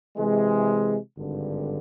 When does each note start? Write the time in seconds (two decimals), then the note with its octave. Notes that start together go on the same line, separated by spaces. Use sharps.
0.16 C3 E3 G#3
1.17 G#1 G2 D3